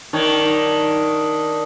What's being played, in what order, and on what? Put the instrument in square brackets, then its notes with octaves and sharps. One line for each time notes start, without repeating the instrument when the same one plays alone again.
[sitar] D#3 [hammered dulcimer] D4 C#5